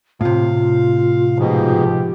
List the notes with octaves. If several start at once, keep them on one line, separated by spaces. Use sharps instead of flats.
A2 C3 F4 F5
G#2 B2 F3 G4